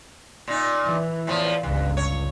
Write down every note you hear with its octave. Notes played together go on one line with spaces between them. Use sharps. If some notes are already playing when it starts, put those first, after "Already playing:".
A#2 D#4
E3
E2 A2 F3
G1 C#2 G2
C#5